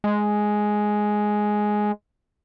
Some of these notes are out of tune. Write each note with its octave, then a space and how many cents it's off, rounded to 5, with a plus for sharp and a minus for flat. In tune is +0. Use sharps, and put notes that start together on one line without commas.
G#3 +5